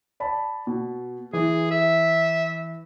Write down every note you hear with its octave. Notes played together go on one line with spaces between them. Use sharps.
D5 A5 B5
B2
E3 G#4
E5